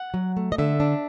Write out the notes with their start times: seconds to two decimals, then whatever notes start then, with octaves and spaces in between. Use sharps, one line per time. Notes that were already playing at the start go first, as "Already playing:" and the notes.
Already playing: F#5
0.14 F#3
0.37 A3
0.52 D#5
0.58 D3 E5
0.80 D4